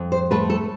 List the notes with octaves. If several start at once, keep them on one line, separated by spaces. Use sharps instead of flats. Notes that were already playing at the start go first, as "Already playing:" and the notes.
Already playing: F2
C5
A3 B4
A4